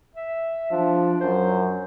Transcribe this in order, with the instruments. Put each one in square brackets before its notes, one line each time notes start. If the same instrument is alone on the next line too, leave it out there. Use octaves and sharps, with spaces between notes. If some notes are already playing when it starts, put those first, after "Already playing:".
[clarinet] E5
[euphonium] F3 [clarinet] D4
[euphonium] F#2 [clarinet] C5